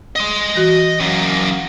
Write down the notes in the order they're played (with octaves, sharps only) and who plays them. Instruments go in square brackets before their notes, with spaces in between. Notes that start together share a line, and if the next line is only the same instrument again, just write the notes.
[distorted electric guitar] D#5 C6
[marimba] E3 F#4
[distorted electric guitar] F#2 A#3